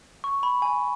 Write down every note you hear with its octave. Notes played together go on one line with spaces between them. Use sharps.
C#6
B5
G#5